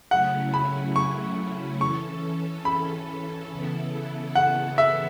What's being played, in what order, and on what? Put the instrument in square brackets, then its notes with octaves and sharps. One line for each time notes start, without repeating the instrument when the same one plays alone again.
[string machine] C#3 F#3 A3 C#4 E4 [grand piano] F#5
[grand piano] B5
C#6
[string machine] E3 C#4 A4 [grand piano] C#6
[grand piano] B5
[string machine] C#3 E3 B3 E4 A4
[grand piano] F#5
E5